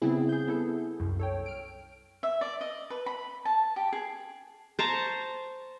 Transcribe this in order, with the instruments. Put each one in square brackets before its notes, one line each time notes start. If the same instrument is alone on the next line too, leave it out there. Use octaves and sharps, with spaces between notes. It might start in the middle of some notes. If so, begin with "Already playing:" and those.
[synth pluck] C#3 G3 B3 C4 E4 G#4
G#4 G6
B3 E4 G#4 A4
C2 F#2
A4 C#5 G5
F6 D7
[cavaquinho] E5
D5
D#5
B4
B5
A5
G4
G#4
[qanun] C5 A5 A#5 C#6